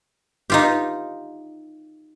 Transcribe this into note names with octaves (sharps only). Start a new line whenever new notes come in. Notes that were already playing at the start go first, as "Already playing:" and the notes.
D#4 F4 G4